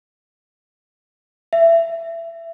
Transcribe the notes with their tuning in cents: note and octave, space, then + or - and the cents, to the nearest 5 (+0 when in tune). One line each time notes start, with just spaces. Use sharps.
E5 +20